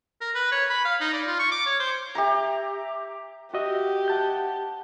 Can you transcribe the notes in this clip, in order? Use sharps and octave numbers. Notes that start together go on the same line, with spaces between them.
A#4
B4
C#5
B5
F5
D#4
D5
F4
C#6
D6
C#5
C5
G4 E5 A#5
F#4 G4 D#5 E5
F#5 A5 G6